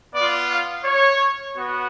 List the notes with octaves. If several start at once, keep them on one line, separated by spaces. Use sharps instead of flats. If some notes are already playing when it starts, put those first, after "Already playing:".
B3 F4 D5
F5
C#5
B3 F#4